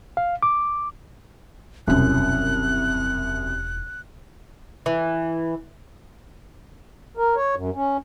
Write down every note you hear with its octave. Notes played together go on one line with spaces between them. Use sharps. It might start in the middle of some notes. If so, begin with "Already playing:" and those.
F5
D6
E1 C2 F#2 E4 F#6
E3
A#4
C#5
F#2
C#4